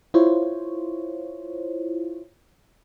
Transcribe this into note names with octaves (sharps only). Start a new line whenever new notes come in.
E4 F4 C5 C#5